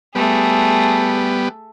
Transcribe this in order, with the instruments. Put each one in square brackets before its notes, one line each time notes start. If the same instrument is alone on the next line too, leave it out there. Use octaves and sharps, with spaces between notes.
[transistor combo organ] G3 B3 [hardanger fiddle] A3 G#4